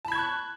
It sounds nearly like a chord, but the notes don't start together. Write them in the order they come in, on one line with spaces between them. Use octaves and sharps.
A5 B5 G#6 C#6 F#6